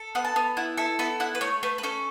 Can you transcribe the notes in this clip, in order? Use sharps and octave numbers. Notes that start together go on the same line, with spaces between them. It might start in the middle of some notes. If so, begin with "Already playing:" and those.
Already playing: A4
B3 F#5
A5
B3
E4 F#5
A4 E5
B3 E5
E4 F#5
B4
A3 C#5
A3 B4
B4
C#4 A4